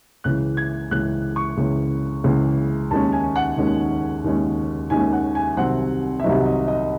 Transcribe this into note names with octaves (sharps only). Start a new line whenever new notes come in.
C#2 C#3 E3 F#6
G#6
C#2 C#3 E3 F#6
C#6
C#2 C#3 E3
C#2 C#3 E3
D#2 D#3 G#3 C#4 A5
G#5
F#5
D#2 D#3 G#3 C#4
D#2 D#3 G#3 C#4
D#2 D#3 G#3 C#4 G#5
F#5
G#5
C2 C3 D#3 F#3 C4 F#5
E5
C2 C3 D#3 F#3 C4 D#5
D#5
D#5